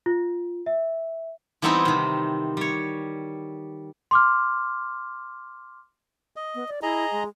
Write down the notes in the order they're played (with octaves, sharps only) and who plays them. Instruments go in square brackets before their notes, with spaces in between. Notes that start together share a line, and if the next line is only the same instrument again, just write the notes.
[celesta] F4
E5
[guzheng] E3 G3 B3 C4 D#4 E4
C3 D#3
G3 C#5
[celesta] C6 D6 F6
[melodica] D#5
[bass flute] B3
D5
[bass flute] E4 [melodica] G#4 D#5 A#5
[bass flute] G#3